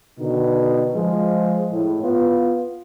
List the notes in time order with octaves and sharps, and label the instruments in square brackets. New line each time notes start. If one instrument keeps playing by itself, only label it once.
[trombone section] B2 D3 D#3 D#4
F3 G#3
A2
B3 F4